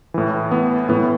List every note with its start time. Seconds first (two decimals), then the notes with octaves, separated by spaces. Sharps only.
0.14 A2 E3
0.51 B3
0.89 A2 E3 B3